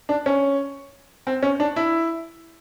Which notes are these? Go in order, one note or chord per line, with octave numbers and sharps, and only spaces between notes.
D4
C#4
C4
C#4
D4
E4